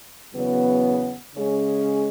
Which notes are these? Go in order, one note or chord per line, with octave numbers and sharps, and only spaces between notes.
E2 C#3 F#3 B3
C#3 G#3 C#4 G#4